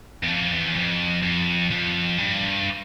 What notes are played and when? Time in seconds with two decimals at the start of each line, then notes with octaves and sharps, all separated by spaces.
0.23 E2
0.28 F2
0.52 E2
0.76 F2
1.23 F2
1.71 F2
2.18 G2